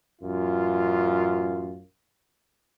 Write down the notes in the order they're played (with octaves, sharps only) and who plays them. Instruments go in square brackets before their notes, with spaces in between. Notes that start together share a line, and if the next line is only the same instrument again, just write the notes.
[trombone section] A1 F#2 F4